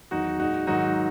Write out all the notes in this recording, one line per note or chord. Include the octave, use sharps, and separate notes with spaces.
E2 D#3 F#3 D#4 F#4
A#2 G#3 D#4 F#4
G#2 D#3 F#3 D#4 F#4